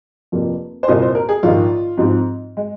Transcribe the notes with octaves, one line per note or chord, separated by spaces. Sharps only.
F1 F2 F3 A#3
C5
C2 A#2 A#3 D#5
C5
A#4
G#4
A#1 G#2 D#3 F4
G#2 F3 C4
G#3